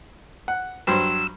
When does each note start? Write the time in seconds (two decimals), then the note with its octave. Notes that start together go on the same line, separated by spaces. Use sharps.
0.48 F#5
0.87 G2 F#3 C5 E6